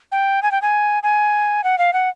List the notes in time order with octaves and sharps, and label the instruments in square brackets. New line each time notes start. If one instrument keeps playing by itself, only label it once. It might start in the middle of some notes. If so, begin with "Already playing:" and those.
[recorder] G5
G#5
G5
G#5
G#5
F#5
F5
F#5